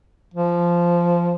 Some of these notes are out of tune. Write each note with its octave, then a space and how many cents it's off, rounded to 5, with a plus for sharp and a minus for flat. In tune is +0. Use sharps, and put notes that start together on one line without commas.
F3 -10